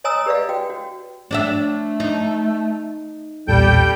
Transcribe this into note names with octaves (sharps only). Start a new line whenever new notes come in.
C#5 D#5 G#5 A#5 D#6 E6
G4 B4 D5 D#5 F5
F#4 G5
F#4
A3 D4 D#5 E5
D#4
B1 E2 A#2 G3 A4 G5 G6